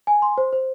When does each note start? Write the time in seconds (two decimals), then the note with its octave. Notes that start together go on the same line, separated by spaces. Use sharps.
0.07 G#5
0.22 C6
0.38 C5
0.53 C5